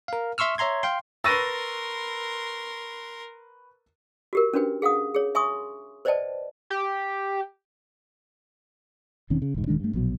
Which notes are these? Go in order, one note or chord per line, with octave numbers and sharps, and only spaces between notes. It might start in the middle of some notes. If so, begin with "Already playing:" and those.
A#4 F5
E5 C6 C#6 E6 F6
C#5 E5 A#5 C6 G#6
F5 G5 C6
A#4 B4 C6 C#6 E6 A6 A#6 D#7
F#4 G4 A#4
C#4 D4 F#4 B4 G5
G#4 F5 F#5 D#6
G#4 C#5
E5 G#5 C6 C#6 D#6
B4 C5 D5 D#5 G5 A5
G4
E1 D#3 C4 C#4
C#3
E1 G#2
D#1 D#3 G#3 D4
G2 A3
A#1 B2 F#3